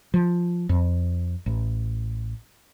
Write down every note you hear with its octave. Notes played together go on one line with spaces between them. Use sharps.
F3
F2
A1